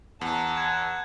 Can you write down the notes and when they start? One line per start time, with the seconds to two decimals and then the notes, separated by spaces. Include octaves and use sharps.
0.21 E2 F#5 A5 A#5
0.57 F#6 G#6